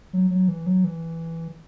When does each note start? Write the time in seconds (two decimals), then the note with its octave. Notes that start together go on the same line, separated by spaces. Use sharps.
0.13 F#3
0.31 F#3
0.48 E3
0.66 F#3
0.84 E3